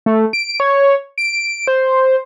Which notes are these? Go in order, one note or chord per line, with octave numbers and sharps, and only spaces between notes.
A3
D7
C#5
D7
C5